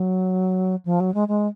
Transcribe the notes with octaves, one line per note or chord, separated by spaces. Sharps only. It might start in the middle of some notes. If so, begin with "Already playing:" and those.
Already playing: F#3
F3
F#3
G#3
G#3